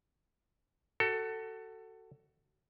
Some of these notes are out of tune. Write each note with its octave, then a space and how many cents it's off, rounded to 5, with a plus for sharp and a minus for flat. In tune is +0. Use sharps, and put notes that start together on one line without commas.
F#4 +25 A4 +15